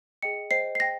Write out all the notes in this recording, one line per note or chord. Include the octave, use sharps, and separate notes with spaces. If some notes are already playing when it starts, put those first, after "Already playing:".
G#4 D#5 G5 C#7
C5 D#5 G5 C7
C7
C5 G5 A#6